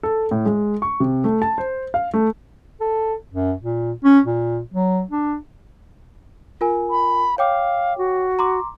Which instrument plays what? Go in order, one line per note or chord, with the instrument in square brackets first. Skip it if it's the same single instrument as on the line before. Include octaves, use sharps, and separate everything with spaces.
[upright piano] A4
A2
G#3
C#6
C3
A3
A5
C5
F5
A3
[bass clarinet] A4
F#2
A#2
C#4
A#2
F#3
D4
[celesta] F4 A#4 G#5
[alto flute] B5
[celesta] C#5 G5 D6 [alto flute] F5
[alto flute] F#4
[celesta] A#5 C6 D6